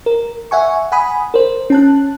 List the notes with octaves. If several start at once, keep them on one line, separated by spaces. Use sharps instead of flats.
A#4
E5 F#5 G#5 C#6
F#5 G#5 B5 D#6
A#4 C5
C#4 A5 F#6